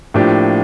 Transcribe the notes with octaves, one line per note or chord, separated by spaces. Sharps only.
A2 F3 A#3 D4 G4